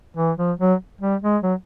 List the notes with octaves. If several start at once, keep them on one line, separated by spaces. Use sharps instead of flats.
E3
F3
F#3
G3
G#3
F#3